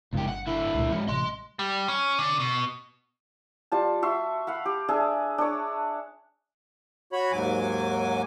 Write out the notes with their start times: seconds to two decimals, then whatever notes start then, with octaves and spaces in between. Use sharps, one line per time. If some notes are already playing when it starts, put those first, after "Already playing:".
0.13 G1 C#2 G2 F3 G4
0.28 F#5
0.47 D3 E4
0.74 C#2 A#2
0.92 G#2 F3 C#4
1.08 A1 C3 D#5 C6
1.59 G3
1.88 C#4
2.19 D3
2.40 B2
3.72 G3 F4 A5
4.02 F#4 E5 C6
4.47 F5 F#5 B5
4.65 G4
4.88 D4 G#4 E5
5.38 D4 C#5
7.13 F#4 C#5 B5
7.32 D#2 G#2 F#3 G#5 D6